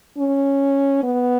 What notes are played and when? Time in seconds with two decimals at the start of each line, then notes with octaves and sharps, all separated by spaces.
0.18 C#4
1.03 B3